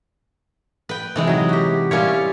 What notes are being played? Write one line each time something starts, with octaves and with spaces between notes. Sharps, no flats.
B4 G5
C3 E3 G#3
F#3 D#4
F#4 G4
G3 C#4 E4 F4 A#4 C#5